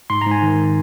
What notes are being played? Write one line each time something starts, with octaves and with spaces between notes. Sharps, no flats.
G#2 C6
A#5
G#2 G#5
D#3